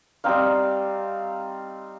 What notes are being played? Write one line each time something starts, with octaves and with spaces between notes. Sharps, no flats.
G3 C4 D#4 F5